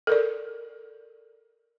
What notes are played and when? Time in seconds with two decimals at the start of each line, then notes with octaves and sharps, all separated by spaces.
0.07 A4 A#4 D5